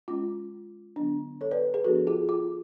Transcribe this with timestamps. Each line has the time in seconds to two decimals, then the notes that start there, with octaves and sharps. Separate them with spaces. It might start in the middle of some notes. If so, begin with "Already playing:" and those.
0.08 G#3 C#4 F4
0.96 D3 F#3 B3 D4
1.41 A4 C#5
1.51 B4 D5
1.74 G#4 B4
1.84 F3 B3 D4 F#4 A4
2.07 F4 G#4
2.29 F4